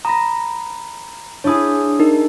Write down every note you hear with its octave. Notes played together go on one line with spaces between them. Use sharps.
A#5 B5 D#6 A#6
D4 E4 G#4 C#5 D#6
D#4 A#4